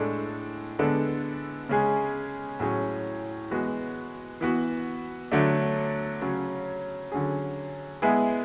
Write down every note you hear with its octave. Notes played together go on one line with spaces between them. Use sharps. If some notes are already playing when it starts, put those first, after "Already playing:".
Already playing: A2 G#3 D4 A4
D3 G#3 B3 D4 A4
C#3 G#3 C#4 G#4
A2 F#3 C#4 G#4
E3 G#3 B3 F#4
E3 B3 F#4
D3 F#3 A3 D4
C#3 F#3 C#4
D3 F#3 C#4 G#4
G#3 B3 E4 G#4